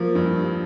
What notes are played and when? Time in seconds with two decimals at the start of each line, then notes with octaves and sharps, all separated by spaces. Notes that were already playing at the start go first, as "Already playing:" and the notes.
Already playing: F3 A#3
0.15 G2